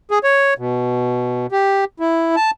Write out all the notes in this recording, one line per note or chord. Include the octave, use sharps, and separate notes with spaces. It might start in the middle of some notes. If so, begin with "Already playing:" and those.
G#4
C#5
B2
G4
E4
A5